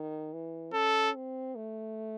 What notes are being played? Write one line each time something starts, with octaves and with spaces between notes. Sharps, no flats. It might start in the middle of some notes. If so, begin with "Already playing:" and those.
Already playing: D#3
E3
C#4 A4
C4
A3